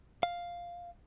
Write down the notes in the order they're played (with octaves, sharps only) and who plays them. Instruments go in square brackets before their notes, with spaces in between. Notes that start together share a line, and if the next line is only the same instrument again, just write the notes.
[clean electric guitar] F5